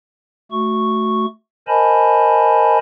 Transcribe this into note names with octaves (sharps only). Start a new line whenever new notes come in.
A3 F#4 C#6
A#4 C5 D#5 G#5 A5 B5